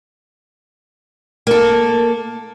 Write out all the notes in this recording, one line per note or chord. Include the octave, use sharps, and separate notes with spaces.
A#3 A4